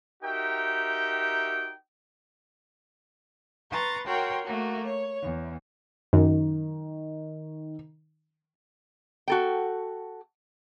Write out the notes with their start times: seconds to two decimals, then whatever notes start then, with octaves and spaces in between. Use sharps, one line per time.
0.23 D#4 F#4 G4 A#4 E5 G5
3.71 B4 A#5 C6 C#6 A6
4.06 F#4 A#4 C#5 G5 C6
4.44 A3 A#3 F#4
4.85 C#5
5.23 E2
6.13 F#2 D#3
9.28 F#4 A4 G5